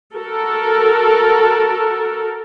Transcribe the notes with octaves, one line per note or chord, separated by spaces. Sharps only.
F#4 A4 A#4